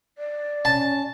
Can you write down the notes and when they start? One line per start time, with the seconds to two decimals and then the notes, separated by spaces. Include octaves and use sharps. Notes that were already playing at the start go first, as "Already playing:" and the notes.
0.18 D5
0.65 C#4 A5